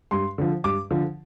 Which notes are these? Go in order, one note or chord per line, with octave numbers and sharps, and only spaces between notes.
G2 C6
D3 F3
G2 D6
D3 F3